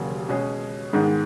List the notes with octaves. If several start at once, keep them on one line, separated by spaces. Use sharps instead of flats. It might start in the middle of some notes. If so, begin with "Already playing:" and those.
Already playing: E1 D#2 C#3 F#3 A#3
B2 G#3 C#4 G#4
G#2 D#3 G#3 B3 D#4